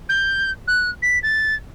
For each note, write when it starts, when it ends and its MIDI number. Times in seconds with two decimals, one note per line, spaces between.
0.09 0.50 91
0.67 0.90 90
1.02 1.18 95
1.23 1.55 93